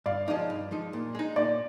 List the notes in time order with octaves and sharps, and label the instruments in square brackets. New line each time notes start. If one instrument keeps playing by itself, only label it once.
[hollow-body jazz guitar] G2 [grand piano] D5 F5
[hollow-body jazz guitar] F3 G#3 D#4 [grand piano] D5 F5
[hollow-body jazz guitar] G2
F3 G#3 D#4
A#2
G#3 D#4
[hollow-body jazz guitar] A#2 [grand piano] D5